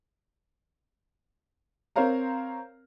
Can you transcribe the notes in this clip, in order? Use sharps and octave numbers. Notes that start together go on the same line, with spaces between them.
C4 A#4 C5 C#5 F5 A#5